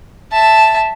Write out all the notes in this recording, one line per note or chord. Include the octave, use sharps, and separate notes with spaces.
E5 A5